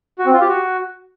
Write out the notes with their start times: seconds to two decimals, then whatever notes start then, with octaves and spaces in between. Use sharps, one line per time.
0.19 F#4
0.26 C4
0.33 F4
0.41 G4
0.48 F#4